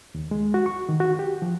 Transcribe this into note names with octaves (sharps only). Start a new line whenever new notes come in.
D#2
G#3
F#4
C#6
D#3
F#4
G4
F3